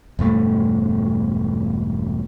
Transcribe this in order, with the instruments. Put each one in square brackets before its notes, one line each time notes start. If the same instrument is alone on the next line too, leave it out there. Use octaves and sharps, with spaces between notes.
[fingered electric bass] E1 G2 A3